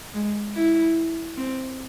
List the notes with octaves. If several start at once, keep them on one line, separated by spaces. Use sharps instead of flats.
G#3
E4
C4